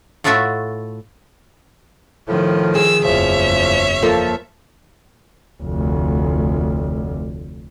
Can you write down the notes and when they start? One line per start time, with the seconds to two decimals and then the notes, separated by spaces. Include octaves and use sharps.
0.24 A2 A3 F4 F#4 A4 E5
2.28 A2 D#3 F3
2.75 G#4 E6
3.04 F#1 E2 F3 C#5 E5
4.03 F3 A#3 A4
5.63 F1 D2